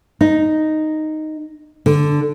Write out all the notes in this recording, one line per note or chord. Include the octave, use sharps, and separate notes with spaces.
D#4
D3